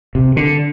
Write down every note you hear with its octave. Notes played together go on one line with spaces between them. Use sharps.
C3
D3